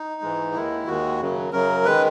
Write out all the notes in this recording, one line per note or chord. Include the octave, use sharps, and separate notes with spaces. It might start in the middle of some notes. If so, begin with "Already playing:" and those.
Already playing: D#4
G#2 E3 G#3
D#2 D#3 G#3 E4
D#2 D#3 G#3 F#4
F#2 C#3 F#3
F#2 C#3 F#3 A#4
D#3 G#3 B4